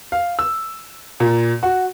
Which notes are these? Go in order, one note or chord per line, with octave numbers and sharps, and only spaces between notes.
F5
E6
A#2
F#4